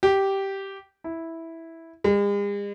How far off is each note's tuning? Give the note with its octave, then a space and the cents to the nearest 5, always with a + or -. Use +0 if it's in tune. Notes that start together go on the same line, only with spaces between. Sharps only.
G4 -10
E4 -5
G#3 -45